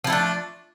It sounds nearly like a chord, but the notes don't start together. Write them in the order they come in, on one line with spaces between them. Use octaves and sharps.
F3 E4 A3 D4